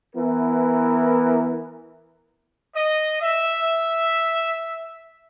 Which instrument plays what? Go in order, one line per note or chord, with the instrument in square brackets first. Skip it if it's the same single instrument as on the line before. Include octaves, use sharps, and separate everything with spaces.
[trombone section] E3 B3 E4 A#4
[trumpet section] D#5
E5